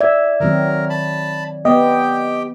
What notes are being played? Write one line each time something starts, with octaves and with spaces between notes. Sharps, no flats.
D5 E5 G#6
D#3 F#3 C4 A#4
A5 B5
B3 G4 D#5 G5